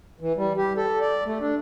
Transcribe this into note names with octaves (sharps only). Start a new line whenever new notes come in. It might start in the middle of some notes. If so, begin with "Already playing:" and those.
E3
G3
G4
A4
D5
A3
D4